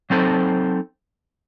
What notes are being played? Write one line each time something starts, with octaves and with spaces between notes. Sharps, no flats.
F#3 C4 D#4 A4 C5